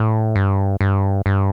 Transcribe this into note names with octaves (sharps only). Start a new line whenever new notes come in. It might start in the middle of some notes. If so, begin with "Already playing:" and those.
Already playing: A2
G2
G2
G2